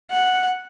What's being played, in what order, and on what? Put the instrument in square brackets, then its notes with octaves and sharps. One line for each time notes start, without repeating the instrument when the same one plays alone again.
[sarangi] F#5